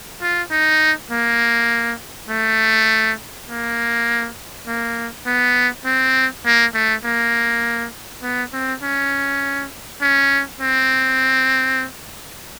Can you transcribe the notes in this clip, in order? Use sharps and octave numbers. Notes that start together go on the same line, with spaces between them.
F4
D#4
A#3
A3
A#3
A#3
B3
C4
A#3
A3
A#3
B3
C4
C#4
C#4
C4